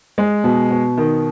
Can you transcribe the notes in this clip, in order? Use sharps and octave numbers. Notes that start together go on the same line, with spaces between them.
G#3
B2
B2
D#3